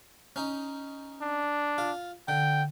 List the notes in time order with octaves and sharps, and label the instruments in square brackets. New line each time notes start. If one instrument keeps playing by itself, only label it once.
[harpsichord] C#4 D#4
[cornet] D4
[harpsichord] F4
[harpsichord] D3 [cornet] G5